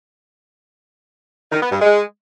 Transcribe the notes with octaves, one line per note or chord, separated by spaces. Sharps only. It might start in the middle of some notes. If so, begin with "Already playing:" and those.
D#3
B3
G2
G#3